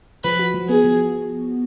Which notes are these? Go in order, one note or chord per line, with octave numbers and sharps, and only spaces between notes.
F3 B4
F#4
F3
B3 G#4
F3